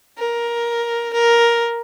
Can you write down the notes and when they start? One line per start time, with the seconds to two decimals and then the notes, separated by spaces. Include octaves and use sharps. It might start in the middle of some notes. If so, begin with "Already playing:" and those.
0.18 A#4
1.14 A#4